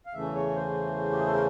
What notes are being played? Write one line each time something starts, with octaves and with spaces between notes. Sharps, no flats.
F5
E2 C#3 E3 A3 C#4 E5
C#5
C5
G4
G#4
A4
A#4